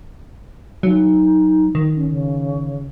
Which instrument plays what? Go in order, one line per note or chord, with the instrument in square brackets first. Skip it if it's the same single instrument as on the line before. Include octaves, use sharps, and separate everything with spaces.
[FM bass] F#3 [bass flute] D#4
[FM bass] D#3
[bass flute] C#4
C#3